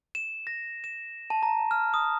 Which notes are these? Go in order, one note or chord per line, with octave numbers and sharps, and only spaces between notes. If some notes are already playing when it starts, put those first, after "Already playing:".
E7
A#6
E7
A5
A#5
F6
D#6